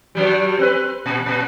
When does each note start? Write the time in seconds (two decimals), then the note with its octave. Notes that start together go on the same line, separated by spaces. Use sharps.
0.15 G2 F#3 G3
0.59 C4 B4
1.06 A#2
1.26 A#2 B3